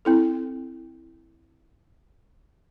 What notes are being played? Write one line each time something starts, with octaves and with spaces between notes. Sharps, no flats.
C4 E4 A4